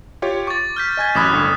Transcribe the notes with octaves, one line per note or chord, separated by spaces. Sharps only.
F4 G4 C#5
C#6 D6 A6
F6 G6 B6
D#5 G#5 G#6
A1 F#2 B5 D6 D#6 F#6
G1 D3 C#6